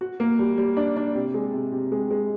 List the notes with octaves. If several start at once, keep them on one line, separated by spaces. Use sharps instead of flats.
F#4
A#3
G3
G3
D4
D4
C3
G#3
C3
C3
G#3
G#3